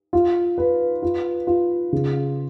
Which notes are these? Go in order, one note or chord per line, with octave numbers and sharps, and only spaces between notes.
F4
B4
F4
F4
C#3